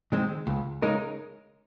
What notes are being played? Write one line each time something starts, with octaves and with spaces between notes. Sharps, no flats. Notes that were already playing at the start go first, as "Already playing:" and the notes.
D#3 G#3 C4
C#2
C#3 G#3 D#4 A#4